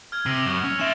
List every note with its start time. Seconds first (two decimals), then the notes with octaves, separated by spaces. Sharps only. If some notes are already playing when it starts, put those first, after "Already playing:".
0.12 F6 G#6
0.26 C3 E6 A#6 C7
0.46 F#2
0.64 C#4
0.80 C#4 E5 A6 A#6 E7